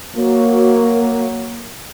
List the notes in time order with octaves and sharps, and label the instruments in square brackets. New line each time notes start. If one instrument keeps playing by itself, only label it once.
[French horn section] F#3 A#3